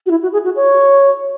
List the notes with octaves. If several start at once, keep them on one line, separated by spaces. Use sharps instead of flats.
F#4
E4
F#4
G#4
F#4
C#5